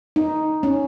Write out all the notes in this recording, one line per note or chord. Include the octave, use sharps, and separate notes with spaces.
D#4
C#4